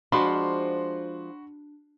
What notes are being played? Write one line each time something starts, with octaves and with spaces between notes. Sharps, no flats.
F3 G#3 D4 F4 F#4 B5 C6